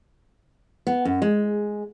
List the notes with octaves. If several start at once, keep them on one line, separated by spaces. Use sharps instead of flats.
B3
F#2
G#3